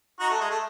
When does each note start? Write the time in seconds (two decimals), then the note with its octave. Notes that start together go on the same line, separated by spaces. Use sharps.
0.20 D#4 F#4
0.30 A3
0.41 G#3
0.51 A3